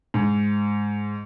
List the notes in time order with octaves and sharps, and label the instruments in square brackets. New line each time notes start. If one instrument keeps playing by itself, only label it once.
[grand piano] G#2